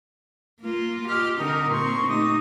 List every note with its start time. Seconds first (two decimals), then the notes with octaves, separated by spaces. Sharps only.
0.61 A#3 F4
1.09 A#2 G4 D#5 F6
1.38 D3 C4 D#4 A#4
1.71 A#2 C4 C6 C#6
2.08 A3 D#4 G4 D#6